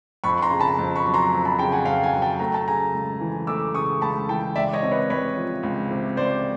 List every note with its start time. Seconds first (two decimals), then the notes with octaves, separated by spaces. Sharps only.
0.24 F2 B5 C#6
0.42 A#5 C6
0.51 C#3
0.60 A5 B5
0.79 F2
0.96 B5 C#6
1.05 F#3
1.14 A#5 C6
1.32 F2
1.45 A5 B5
1.59 C#3 G5 A5
1.72 F#5 G#5
1.85 F2 F5 G5
2.03 F#5 G#5
2.13 F#3
2.22 G5 A5
2.39 A3 A#5
2.54 A5
2.68 C#3 G#5 A#5
2.93 C#2
3.21 E3
3.47 A3 D6 E6
3.75 C#3 C#6 D#6
4.01 C#2 A5 B5
4.29 E3 G5 A5
4.56 C#2 D5 E5
4.73 C#5 D#5
4.83 C3
4.91 B4 C#5
5.10 C#2 B4 C#5
5.36 F3
5.63 C#2
5.91 C3
6.17 C#2 C5 D5